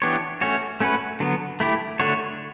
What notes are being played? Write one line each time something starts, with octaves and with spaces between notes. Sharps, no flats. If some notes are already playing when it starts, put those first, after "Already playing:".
E3 B3 D4 G4 C#5
A3 C#4 F#4 C#5
A3 C#4 F#4 B4
D3 F#3 B3
A3 E4 G4
D3 A3 D4 F#4 C#5